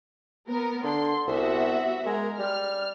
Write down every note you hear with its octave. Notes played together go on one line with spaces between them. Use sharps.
B3 A#4
D3 C6
C2 B3 F#4 E5
G#3 A#4
G3 F6